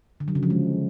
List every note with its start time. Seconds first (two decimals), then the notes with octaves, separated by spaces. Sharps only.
0.20 D3
0.28 F#3
0.35 C#3
0.43 F3
0.50 G#3